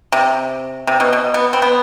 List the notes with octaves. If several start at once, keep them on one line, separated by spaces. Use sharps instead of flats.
C3
C3
B2
B2
B3
C4
B3